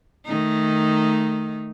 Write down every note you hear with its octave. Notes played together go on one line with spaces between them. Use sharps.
D#3 A3 D#4